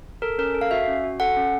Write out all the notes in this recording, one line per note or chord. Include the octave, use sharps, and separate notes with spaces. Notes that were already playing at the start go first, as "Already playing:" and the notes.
A4 A#4
C#4 A#4
A4
F5
F#4 E5
C#4
F#4
A4 F#5
C#4